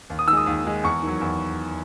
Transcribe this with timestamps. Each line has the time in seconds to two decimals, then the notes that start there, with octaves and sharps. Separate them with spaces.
0.10 D#2
0.19 D#6
0.28 D#3 E6
0.33 G#3 D#6
0.46 D#2 D#6
0.65 D#3 G#3
0.83 E2 C#6
1.03 D#3 F#3
1.21 E2